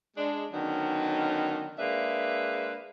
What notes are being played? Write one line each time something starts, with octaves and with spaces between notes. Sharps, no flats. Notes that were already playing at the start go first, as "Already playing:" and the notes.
G#3 D4
D3 D#3 F#3 B3 C#4 D#4
G#3 A#3 D4 G#4 B4 E5